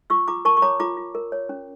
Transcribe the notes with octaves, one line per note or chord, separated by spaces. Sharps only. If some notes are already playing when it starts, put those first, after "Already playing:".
F4 C#6 E6
F4 A#5 D6
A#4 A5 C#6
C#6
C#5 A#5 D6
F4 A#5 D6
F4
A#4
C#5
C#4